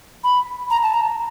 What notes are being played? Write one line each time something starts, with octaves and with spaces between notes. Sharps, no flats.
B5
A#5
A5
A#5